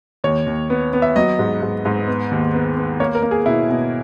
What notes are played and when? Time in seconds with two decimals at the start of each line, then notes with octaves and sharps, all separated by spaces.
0.24 D#2 C#5
0.47 D#2
0.70 B3
0.93 B3
1.02 E5
1.16 F#3 D#5
1.39 G#2
1.62 G#2
1.85 G#2
2.08 B3
2.31 D#2
2.54 B3
2.77 B3
3.00 A#3 C#5
3.15 A#4
3.23 A#3
3.31 G#4
3.46 B2 E4
3.69 B2